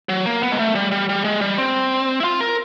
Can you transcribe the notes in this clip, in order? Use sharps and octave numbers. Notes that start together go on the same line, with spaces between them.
F#3
A#3
B3
G#3
A3
G3
G3
G3
G#3
G3
C4
E4
F4
A#4